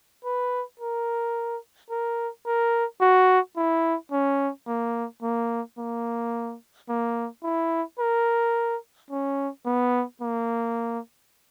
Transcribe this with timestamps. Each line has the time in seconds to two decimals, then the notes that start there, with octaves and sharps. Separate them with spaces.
0.24 B4
0.80 A#4
1.90 A#4
2.46 A#4
3.01 F#4
3.57 E4
4.12 C#4
4.67 A#3
5.23 A#3
5.78 A#3
6.89 A#3
7.44 E4
7.99 A#4
9.10 C#4
9.66 B3
10.22 A#3